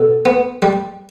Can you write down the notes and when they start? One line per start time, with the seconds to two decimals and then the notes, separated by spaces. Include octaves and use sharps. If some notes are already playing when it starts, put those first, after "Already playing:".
Already playing: B2 A4
0.25 B3
0.62 G3